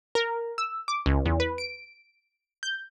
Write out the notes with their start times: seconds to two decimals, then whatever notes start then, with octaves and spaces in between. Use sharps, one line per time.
0.15 A#4
0.58 E6
0.88 D6
1.06 C#2
1.26 E2
1.40 B4
1.58 D7
2.63 G6